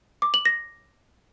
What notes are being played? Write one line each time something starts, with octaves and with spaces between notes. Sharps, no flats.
D6
F#7
A#6